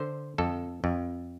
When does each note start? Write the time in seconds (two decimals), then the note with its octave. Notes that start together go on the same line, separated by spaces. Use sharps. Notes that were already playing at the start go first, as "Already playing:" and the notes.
Already playing: D3 C5
0.38 F2 A4
0.84 F2